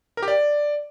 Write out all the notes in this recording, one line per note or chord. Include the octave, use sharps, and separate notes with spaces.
A#4
G4
D5